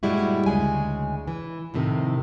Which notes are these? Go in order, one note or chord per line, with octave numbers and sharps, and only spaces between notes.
G2 A#2 G3 G#3 E4 F#4
D2 C#3 G#3 G#5
E3
F2 A2 C3 D#3